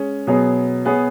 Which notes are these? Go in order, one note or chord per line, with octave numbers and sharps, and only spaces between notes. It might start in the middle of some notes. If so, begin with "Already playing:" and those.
Already playing: G#3 C#4 G#4 C#5
B2 F#3 B3 G#4 C#5
B3 G#4 C#5